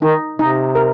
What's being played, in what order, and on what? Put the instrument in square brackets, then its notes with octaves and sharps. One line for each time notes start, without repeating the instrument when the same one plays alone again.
[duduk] D#3 [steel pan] D#4
[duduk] C3 [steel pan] D#4
[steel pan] A#4